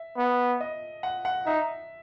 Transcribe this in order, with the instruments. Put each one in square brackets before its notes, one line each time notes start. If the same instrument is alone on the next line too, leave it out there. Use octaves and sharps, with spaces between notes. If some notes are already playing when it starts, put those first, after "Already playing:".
Already playing: [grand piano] E5
[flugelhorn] B3
[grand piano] D#5
F#5
F#5
[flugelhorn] D#4 [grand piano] E5